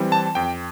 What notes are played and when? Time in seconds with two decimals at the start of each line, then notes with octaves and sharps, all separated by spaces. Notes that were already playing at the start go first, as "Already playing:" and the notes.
Already playing: E3 G3 C4
0.12 A5
0.35 F2 G5